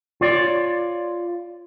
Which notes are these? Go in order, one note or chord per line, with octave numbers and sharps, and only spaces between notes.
F4 C#5 D5